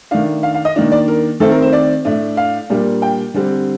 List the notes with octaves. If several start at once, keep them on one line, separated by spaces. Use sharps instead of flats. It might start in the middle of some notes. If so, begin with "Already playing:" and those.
D#3 A3 D4 F5
F5
F5
D#5
D#3 A#3 D4
D5
A#4
D#3 A3 C4 A4
A#4
C5
D5
A2 A3 D4
F5
A#2 G3 A#3 D4
G5
D3 G3 C4